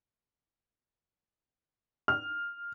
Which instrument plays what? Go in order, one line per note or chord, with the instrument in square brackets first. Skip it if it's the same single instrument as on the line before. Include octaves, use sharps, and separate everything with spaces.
[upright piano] F6